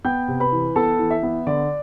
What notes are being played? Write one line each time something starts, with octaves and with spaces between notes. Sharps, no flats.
B3 G5 G6
C3
B4 B5
E3
B3 A4 A5
E3
E5
B3
D3 D5